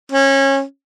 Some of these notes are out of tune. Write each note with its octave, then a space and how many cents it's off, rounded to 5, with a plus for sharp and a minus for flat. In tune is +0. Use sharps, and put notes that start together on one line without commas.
C#4 -25